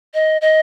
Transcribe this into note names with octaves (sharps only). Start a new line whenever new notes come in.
D#5
D#5